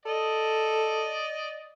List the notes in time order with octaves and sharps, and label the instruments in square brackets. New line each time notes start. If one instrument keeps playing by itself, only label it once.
[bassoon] A4 [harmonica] D5 D#5